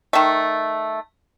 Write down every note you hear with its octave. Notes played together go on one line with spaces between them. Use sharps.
D#3 A3